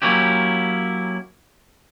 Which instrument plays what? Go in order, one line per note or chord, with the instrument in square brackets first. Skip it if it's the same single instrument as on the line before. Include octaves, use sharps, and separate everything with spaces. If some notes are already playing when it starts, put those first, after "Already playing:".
[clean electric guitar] F#3 A#3 C#4 E4 G4